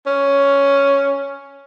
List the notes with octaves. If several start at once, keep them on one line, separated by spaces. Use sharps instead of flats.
C#4